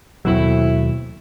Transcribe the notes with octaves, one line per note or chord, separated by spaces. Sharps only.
D#2 B2 F#3 A3 C4 E4